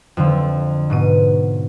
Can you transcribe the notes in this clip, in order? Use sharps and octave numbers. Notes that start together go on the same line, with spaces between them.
F2 D3 F3
G#2 B2 D#7